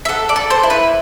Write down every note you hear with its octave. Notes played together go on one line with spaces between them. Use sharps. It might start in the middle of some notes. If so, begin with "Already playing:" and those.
E5
A4 F#5
D5
A4
C5
E4
B4